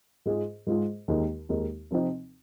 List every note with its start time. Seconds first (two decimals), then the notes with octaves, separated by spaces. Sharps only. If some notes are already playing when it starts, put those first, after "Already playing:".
0.26 G#2 G#3 F4 G#4
0.67 G#2 G#3 F4 G#4
1.08 D#2 D#3 G#3 D#4 A#4
1.49 D#2 D#3 G#3 D#4 A#4
1.91 C3 F3 C4 D#4